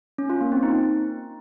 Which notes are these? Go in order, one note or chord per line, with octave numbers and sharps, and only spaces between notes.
C#4
F4
A#3
C4
D#4